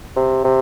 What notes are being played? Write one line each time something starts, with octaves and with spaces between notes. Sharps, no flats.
C3
C3